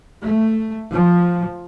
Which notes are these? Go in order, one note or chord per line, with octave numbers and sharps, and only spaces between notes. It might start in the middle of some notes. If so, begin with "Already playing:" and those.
A3
F3